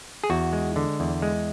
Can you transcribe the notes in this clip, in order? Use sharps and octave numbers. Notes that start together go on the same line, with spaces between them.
G#4
E2 F#4
G#3
D3
E2
G#3